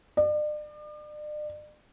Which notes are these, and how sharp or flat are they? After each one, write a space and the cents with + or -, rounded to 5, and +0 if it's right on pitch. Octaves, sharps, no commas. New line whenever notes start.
D5 +40